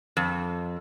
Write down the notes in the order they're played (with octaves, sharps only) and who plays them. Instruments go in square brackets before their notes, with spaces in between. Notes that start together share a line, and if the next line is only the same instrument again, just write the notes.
[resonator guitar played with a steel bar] F2